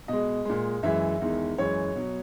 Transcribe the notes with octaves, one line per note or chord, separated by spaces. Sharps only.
B2 G#3 D#5
A#2 G#3
F#2 E3 G#3 E5
E2 D#3 G#3
F#2 E3 G#3 C#5
B2 F#3